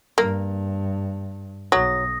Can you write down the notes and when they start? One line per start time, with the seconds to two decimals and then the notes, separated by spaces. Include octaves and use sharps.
0.18 G2 A#3
1.72 B1 F#3 D#6 A#6